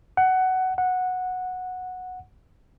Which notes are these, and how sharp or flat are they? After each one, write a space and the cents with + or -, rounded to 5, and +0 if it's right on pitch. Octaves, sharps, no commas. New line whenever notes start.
F#5 +15
F#5 -10